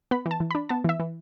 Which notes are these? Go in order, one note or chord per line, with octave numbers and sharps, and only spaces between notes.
B3 B5
E3
A5
E3
B5
D4
B3 A5
E3 E5
E3